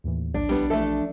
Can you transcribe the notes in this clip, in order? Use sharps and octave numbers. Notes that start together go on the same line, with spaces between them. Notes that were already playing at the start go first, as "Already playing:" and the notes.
D#2 A2 E3
A#1 D4
C2 G3 B3 G4
E3 F3 A3 A4 E5